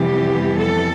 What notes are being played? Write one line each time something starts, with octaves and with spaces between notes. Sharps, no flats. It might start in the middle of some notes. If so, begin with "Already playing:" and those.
Already playing: F2 C3 E3 G3 B3 G4
A4